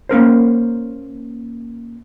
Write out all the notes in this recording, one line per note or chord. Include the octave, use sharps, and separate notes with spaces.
A#3 C#4 A#4 C5